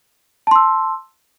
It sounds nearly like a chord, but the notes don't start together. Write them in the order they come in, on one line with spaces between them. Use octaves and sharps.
A5 C6 E6